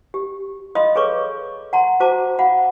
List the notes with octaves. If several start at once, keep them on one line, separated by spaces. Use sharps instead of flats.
G4
D#5 F5 B5 C6 D#6
G#4 A4 B4 C#5 C#6 D6
F#5 A#5 C6
F#4 C5 A5 A#5 D6
F5 F#5 B5